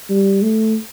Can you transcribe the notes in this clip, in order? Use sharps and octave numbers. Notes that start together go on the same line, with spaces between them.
G3
A3